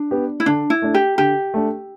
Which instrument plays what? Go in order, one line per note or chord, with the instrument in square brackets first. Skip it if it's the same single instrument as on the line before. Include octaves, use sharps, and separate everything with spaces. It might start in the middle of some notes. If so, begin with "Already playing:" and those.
Already playing: [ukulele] D4
[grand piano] B3 G4
[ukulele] E4
[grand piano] D3 [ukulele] D4
[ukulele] E4
[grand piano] A3 D4
[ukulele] G4
[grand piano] D3 [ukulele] G4
[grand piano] A3 D4